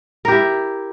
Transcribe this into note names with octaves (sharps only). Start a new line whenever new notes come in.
E4 G4 A#4